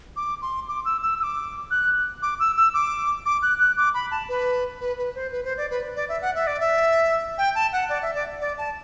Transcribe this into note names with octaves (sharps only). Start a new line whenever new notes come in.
D6
C6
D6
E6
E6
E6
D6
F#6
D6
E6
E6
D6
D6
F#6
F#6
D6
B5
A5
B4
B4
B4
C5
B4
C5
D5
B4
D5
E5
F#5
E5
D5
E5
G5
A5
F#5
D5
E5
D5
D5
A5